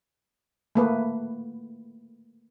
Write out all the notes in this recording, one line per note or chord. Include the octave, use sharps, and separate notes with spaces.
A3 A#3 B4